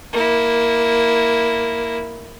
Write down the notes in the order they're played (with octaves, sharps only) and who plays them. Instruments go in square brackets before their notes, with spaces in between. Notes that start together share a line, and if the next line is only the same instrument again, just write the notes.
[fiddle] A#3 E4